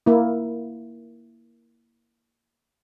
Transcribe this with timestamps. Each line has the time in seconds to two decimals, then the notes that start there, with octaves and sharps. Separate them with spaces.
0.06 A#3 E4